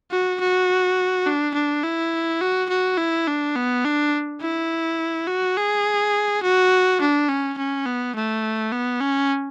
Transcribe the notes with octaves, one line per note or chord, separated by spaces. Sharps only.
F#4
F#4
D4
D4
E4
F#4
F#4
E4
D4
B3
D4
E4
F#4
G#4
F#4
D4
C#4
C#4
B3
A3
B3
C#4